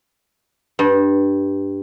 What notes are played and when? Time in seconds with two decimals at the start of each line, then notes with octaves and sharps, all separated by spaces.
0.79 G2